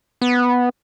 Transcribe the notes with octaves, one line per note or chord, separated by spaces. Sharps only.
B3